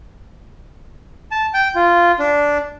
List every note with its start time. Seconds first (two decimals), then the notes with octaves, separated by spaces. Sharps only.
1.31 A5
1.54 G5
1.76 F4
2.19 D4